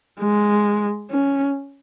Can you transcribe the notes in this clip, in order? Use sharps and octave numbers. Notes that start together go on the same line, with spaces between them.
G#3
C#4